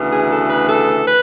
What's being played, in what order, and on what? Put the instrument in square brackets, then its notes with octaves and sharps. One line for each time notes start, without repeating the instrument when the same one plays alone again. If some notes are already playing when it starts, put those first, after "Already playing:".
Already playing: [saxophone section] D2 C#3 E3 B3
G#4
A4
B4
A4
B4